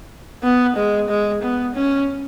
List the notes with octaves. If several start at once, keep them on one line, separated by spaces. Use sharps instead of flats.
B3
G#3
G#3
B3
C#4